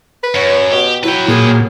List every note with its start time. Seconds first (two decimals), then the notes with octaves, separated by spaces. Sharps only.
0.23 B4
0.34 F#2 C#5
0.72 B2 G4
1.04 F#3 E4 B4 G5
1.28 A#2 G#4